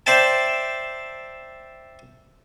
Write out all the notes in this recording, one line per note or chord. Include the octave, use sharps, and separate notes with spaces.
C5 D5 E5 G5 A5